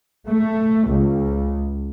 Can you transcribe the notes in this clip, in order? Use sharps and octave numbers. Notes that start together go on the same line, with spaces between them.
A3
C#2